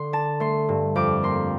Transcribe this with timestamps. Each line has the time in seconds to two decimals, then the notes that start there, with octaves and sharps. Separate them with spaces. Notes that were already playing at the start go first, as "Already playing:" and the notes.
Already playing: D3 C6
0.13 D4 A5
0.40 A3 C6
0.69 G2
0.96 F2 D6
1.23 A#3 C6